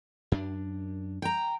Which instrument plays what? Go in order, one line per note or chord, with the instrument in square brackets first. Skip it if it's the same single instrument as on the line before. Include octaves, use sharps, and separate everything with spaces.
[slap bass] F#2 D4
[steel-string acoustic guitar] G5 A#5